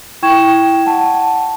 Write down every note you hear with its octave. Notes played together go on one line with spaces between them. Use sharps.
E4 G5 C#6 G#6 E7
F#5 A5